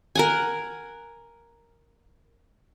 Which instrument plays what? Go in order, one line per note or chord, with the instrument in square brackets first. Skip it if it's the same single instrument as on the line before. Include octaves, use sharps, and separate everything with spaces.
[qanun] A#4 F#5 G#5